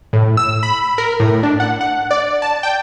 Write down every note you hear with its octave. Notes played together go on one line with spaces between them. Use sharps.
A2
E6
B5
A#4
A2
D4
F#5
F#5
D5
A5
G5